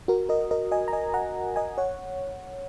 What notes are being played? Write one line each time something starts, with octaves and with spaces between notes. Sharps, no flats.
F#4 A#4
A#4 D#5
A#4 D#5
D#5 G#5
A#5
D#5 G#5
F#5 A#5
D#5 G#5
C#5 F#5